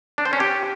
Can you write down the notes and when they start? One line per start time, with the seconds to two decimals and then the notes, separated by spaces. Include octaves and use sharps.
0.18 D4
0.25 C5
0.33 C#4
0.40 G4